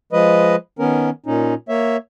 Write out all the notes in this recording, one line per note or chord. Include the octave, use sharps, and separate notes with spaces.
F3 G#3 B4 D#5
D#3 B3 C#4 A#4
A#2 C#4 D#4
A#3 C#5 E5